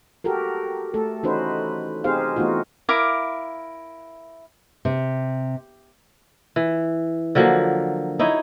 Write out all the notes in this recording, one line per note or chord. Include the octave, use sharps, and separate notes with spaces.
F#4 G4 A4 A#4
A3 A4
E3 C#4 D#4 F#4 B4 C5
C4 D#4 G4 G#4 C5 F5
E3 A3 B3 D#4 F4 F#4
E4 A#4 F5 D6
C3
E3
D3 F3 F#3 A#3
D#4 E4 C#5 D#5